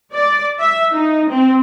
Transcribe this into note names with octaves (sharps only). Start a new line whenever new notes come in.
D5
E5
D#4
C4